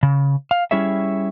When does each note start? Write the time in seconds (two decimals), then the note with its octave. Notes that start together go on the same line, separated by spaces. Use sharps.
0.03 C#3
0.51 F5
0.71 G3 C#4 E4 G#4 C#5 E5